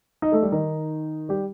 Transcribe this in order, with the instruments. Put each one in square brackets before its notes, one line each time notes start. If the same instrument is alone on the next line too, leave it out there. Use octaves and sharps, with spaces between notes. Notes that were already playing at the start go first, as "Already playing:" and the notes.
[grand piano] D#4 D#5
A3 A4
G3 G4
D#3 D#4
G3 G4